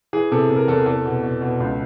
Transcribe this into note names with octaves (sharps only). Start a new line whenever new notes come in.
E3 G#4
C3 A4
C3
A#4
E2 A4
E2 A4
B2
B2
B2
C#2